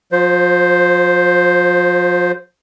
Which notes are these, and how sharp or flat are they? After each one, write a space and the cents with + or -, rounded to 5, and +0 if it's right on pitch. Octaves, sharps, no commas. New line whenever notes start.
F3 +30 C5 +0